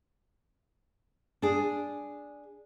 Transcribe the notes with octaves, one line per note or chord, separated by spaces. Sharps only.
D4 G#4